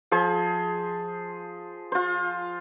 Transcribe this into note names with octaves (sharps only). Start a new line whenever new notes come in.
F3 G#4 C5
F4 C5